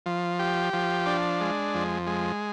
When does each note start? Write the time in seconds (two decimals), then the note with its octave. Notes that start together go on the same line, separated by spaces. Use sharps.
0.06 F3
0.39 G4
0.73 F3
1.06 D4
1.41 G#3
1.74 F2
2.07 G#3